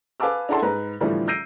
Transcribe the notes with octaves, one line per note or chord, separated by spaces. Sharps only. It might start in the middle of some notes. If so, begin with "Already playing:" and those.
B4 F5 G#5 A5 D6 E6
D4 E4 A4 F#5 A5 C6
G#2 B4 A#5
A2 D3 E3 F3 G3 A3
E6 G6 A#6 C7 D7 D#7